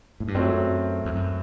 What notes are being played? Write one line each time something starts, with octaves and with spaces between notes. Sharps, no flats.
A2
G2
F#2 F#3 A3 C4
E2
F#2